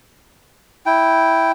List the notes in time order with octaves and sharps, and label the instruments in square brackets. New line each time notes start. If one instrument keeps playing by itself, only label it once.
[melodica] E4 G5